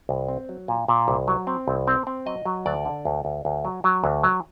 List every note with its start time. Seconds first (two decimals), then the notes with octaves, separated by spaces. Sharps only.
0.09 C2
0.28 C4
0.49 F#3
0.68 A#2
0.88 A#2
1.08 C2
1.28 F#3
1.47 C4
1.68 C2
1.88 C4
2.07 C4
2.26 F#3 D#5
2.45 F#3
2.66 D2 D5
2.85 D3
3.05 D2
3.25 D2
3.45 D2
3.65 F#3
3.84 F#3
4.04 D2
4.23 F#3